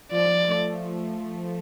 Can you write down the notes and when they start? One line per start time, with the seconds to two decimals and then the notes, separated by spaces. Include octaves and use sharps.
0.11 F3 D5
0.46 A3